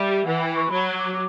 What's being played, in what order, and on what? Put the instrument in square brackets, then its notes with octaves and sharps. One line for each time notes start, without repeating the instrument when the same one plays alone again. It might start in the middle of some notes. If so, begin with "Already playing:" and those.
Already playing: [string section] G3 [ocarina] E5
[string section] E3 [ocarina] F#5
[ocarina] G5
C#6
[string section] F#3 [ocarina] B5
[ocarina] D6
D6